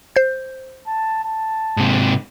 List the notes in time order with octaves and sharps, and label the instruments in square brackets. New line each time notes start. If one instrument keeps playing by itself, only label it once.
[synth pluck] C5 G6
[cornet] A5
A5
[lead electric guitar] G#2 C3